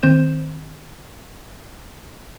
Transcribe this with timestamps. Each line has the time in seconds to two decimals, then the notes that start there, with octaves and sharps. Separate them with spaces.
0.03 D#3 C4 C5 G6 E7